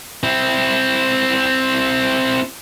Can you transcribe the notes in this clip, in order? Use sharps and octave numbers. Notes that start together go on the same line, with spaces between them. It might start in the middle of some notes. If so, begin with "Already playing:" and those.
C4 E4